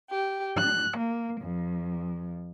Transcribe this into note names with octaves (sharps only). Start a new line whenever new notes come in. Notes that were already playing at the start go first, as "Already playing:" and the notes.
G4
F#6
A#3
F2